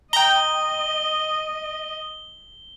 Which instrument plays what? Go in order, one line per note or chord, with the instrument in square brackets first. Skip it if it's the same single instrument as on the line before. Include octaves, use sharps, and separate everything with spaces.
[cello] D#5 [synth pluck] G5 A#5 [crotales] G7